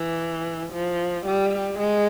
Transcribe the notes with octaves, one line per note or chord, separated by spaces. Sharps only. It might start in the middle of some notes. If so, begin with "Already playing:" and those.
Already playing: E3
F3
G3
G#3